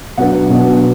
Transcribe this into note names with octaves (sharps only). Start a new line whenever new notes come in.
B2 F#3 B3 D4 F#5
B2 F#3 B3 D4